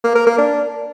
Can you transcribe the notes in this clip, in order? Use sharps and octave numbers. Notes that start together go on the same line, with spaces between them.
A#3
A#4
A#3
D4